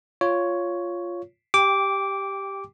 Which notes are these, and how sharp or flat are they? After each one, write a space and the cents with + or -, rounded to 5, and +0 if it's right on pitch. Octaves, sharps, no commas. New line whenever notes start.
F4 +0 C#5 +5
G4 +0 G5 +20 D6 -10